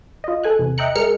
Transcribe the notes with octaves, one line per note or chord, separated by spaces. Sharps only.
F4 D#5
A4 G#5 F#6
E2 C3
D#5 E5 G5 A#5 F#6 C#7
G#3 G#4 A#4 F6 C#7